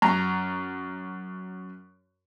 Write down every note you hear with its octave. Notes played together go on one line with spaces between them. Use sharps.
F#2 A#5